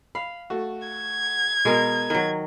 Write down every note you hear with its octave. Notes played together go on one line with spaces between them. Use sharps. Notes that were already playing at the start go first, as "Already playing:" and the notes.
F5 B5
A3 F#4
G#6
B2 G#3 A#4
D#3 F#3